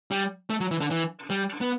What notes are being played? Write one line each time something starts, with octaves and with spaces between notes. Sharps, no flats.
G3
A3
F#3
E3
D3
E3
G3
B3